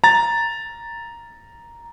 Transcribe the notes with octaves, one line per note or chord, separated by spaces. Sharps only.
A#5 A6